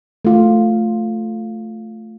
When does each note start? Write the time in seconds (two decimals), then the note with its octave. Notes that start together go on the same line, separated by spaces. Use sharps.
0.25 A3 F4